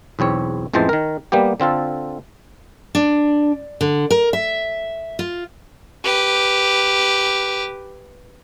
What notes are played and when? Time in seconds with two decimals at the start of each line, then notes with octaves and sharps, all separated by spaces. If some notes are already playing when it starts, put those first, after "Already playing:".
0.19 B1 E2 C4 C#5
0.74 A1 F2 E3 G#3 C5 A5
0.89 D#3 A#4
1.32 G3 A#3 B3 G4
1.60 D3 C4 F4 A4
2.95 D4
3.81 D3
4.11 A#4
4.33 E5
5.19 F4
6.04 G4 B4